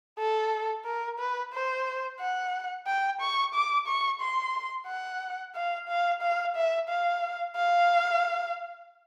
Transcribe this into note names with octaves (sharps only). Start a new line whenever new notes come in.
A4
A#4
B4
C5
F#5
G5
C#6
D6
C#6
C6
F#5
F5
F5
F5
E5
F5
F5